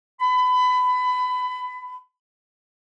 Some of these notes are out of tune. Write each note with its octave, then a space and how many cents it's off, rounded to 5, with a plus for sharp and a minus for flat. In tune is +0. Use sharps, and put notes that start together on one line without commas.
B5 +25